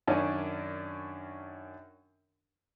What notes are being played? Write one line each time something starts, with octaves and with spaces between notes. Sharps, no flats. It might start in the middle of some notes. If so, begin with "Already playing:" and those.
F#2 D#3 C#4 D4